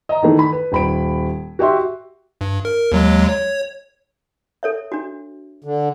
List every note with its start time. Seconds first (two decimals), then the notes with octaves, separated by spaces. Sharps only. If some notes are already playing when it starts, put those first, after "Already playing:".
0.09 D#5 A#5
0.22 D#3 E3 A3
0.39 B5
0.53 B4
0.72 D#1 B5 D7
1.59 F#4 G4 E5 C6
2.41 G2
2.65 A#4
2.92 D#2 F#3 G#3
3.29 C#5
4.63 A4 C#5 E5
4.92 D4 F#4
5.64 D3